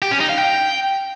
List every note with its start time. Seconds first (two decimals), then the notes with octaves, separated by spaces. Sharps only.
0.02 G4
0.11 C#4
0.20 D#4
0.29 F5
0.38 G5